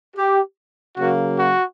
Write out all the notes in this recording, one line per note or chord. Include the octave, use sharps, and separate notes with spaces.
G4
C#3 F#3 A#3 F#4
F#4